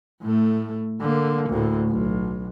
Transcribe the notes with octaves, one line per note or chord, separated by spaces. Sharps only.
A2 A3
D3 A#3
D2 A2
B1